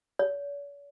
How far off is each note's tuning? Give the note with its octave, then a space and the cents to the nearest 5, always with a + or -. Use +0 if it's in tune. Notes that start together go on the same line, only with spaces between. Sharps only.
C#5 +45